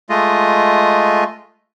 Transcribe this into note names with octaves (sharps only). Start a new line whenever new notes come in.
G#3 A3 F4 D#5